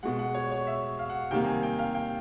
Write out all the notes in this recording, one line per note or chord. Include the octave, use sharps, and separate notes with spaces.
B2 G#3 F#5
F#5
C#5
C#5
E5
F5
F#5
C3 D#3 G3 A#3 G5
G#5
G5
F5
G5